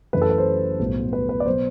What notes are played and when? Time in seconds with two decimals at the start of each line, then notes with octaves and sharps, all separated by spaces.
0.13 F#2 E3 A3 B4
0.22 A4
0.30 B4
0.38 C5
0.79 B1 A2 G3 B3
1.13 B4
1.29 B4
1.40 D5
1.46 B2 F#3 B3 C5